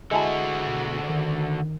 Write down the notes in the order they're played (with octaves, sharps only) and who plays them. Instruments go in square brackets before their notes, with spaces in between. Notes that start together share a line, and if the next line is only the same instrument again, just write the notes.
[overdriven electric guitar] D3 F#4 [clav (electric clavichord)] G#3 E4 A5
[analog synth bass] B2
D#3